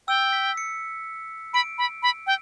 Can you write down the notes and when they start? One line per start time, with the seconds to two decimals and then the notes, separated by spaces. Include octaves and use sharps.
0.08 G5 E6
0.33 B6
0.57 C#7
1.54 B5 D7
1.78 B5
2.03 B5
2.27 G5